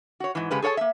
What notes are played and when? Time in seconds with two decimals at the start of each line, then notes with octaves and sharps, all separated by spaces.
0.20 F#4 C#5
0.35 G#2 E3
0.51 C#3 G#3 G4 A4 B4
0.62 G#4 A4 C#5 F5 A5
0.77 A#3 E5